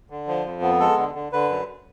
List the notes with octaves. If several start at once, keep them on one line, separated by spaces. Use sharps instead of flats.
D3
F3
F2
B3
G#3 A4
D3
D3
D3 B4
F#2